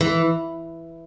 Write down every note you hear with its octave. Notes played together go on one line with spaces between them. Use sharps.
E3